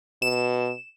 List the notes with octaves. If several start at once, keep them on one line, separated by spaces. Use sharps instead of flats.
B2 E7